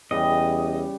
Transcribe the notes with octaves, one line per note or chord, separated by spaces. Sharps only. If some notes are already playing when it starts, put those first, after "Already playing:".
E2 C#3 G3 D#5